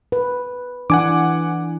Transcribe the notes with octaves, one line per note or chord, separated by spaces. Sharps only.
B4
E3 D4 F#5 G#5 D6